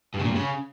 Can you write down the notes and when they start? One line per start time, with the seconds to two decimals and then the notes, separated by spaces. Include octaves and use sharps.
0.14 G2
0.19 C#3
0.25 A#2
0.30 G2
0.36 C#3